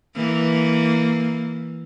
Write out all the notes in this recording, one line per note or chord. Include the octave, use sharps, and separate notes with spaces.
E3 A#3